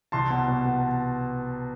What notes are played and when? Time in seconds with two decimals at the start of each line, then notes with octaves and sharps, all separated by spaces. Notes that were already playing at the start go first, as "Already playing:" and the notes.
0.12 C2 A5 C6
0.30 B2
0.48 B2
0.65 B2